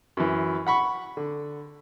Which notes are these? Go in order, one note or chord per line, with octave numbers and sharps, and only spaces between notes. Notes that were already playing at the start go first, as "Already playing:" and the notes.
F#2 E3
F#5 B5 C#6
D3